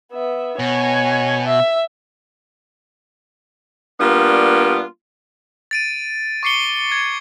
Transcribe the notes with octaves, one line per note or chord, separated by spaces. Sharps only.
B3 E5
B2 C#5 G#5
E5
G3 A#3 B3 D4 F4
A6 D7 D#7
C#6 D6 C7 C#7 G7
G#6